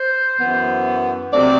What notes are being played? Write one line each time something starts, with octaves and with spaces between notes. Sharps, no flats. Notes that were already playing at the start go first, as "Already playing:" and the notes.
Already playing: C5
F#2 E3 B3
C3 F#3 A3 C4 D5